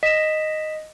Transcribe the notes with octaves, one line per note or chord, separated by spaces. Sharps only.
D#5 B6 E7